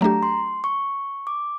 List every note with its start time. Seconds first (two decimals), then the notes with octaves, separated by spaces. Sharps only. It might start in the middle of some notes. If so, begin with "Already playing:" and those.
0.01 F#3 A3 D4 G4 A#5
0.23 C6
0.64 C#6
1.27 D6